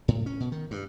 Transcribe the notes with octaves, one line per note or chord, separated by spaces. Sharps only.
A2
C#4
B2
D#3
G2